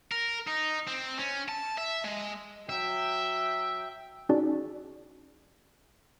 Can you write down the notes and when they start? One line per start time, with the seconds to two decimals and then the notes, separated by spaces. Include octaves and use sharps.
0.12 A#4
0.48 D#4
0.88 C4
1.19 C#4
1.49 A5
1.78 E5
2.04 G#3
2.69 F#3 E5 G5
4.29 C#4 D#4 F#4 G#4 D5 A5